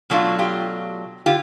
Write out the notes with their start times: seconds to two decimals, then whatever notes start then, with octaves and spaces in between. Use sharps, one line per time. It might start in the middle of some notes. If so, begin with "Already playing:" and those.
0.10 B2 F#3 A3 D4 F4
0.39 F4 G4
1.26 D3 F4 G4